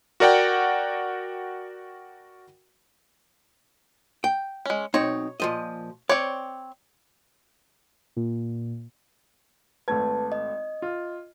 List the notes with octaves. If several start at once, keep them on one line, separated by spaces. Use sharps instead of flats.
F#4 A#4 D5 F#5 G5
G5
G#3 C#4
B1 C4 D#4 C#5
A#2 F3 D#5
C4 C#5 D5
A#2
G#1 A3 B4 A5 G#6
D#5
F4